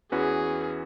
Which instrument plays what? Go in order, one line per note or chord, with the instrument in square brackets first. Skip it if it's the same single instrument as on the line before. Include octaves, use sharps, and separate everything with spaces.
[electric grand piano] E2 E3 C#4 F#4 B4 [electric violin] G#4